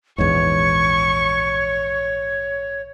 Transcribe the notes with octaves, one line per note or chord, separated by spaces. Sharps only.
A#1 E2 G#2 C#5 C#6